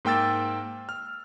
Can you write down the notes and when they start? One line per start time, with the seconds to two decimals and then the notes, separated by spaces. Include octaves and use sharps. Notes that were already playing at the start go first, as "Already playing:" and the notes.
0.05 G#2 A#3 G5 E6 A6
0.89 F6